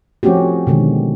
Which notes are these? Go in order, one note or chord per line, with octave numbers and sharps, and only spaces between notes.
F3 A3 C4 C#4 F#4 G4
B2 D3 D#3 G#3